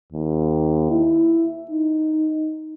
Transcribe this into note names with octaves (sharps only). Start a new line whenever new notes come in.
D#2
E4
D#4